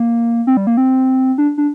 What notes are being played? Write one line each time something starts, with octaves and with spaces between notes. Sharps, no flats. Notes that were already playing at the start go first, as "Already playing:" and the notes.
Already playing: A#3
C4
G3
A#3
C4
D4
D4